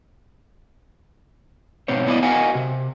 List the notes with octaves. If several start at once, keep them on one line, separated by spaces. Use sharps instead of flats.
G#2 B2 C4 C#5
B3 E4 F#4 D5 D#5
F#4 A#4 D#5 F5 F#5 G#5
C3